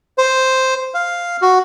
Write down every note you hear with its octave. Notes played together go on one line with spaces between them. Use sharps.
C5
F5
F#4